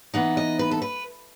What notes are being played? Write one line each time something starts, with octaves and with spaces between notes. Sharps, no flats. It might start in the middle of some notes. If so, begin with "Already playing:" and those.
E3 B3 D#4 F#5
D#5
B4
A4
B4